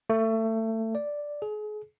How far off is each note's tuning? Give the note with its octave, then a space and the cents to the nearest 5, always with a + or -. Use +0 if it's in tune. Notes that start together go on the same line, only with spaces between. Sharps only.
A3 +25
D5 +0
G#4 +35